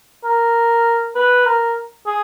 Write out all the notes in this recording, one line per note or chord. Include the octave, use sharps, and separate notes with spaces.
A#4
B4
A#4
G#4